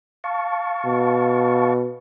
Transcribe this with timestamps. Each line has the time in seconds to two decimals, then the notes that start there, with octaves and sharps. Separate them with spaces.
0.24 F5 A5 C#6
0.86 B2